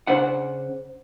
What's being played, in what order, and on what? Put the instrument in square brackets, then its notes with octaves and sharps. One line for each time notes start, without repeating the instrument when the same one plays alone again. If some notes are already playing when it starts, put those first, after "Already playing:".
[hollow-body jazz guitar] C#3 D4 C5 F#5